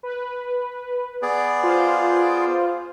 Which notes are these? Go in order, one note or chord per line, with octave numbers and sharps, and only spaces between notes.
B4
B3 G#4 D5
F4 C5